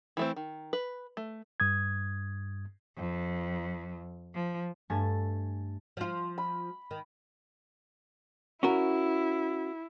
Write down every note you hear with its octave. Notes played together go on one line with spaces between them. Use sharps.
E3 A3 C4
D#3
B4
A3
G2 D#6 G#6
F2
F3
G2 A3 G#5 A6
F3 F4
B5
D#3
C#4 E4 F#4 A#4